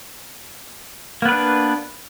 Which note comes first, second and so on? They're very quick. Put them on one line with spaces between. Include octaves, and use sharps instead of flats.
A#3 B3 B4 D4